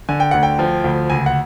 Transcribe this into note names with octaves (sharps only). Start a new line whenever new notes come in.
D3 G#5
G5
D2 F#5
G5
F3
D2
C#2 G#5
F#5